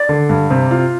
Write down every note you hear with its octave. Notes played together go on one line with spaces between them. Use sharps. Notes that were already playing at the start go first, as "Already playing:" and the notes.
Already playing: D5
D3
G2
C3
F4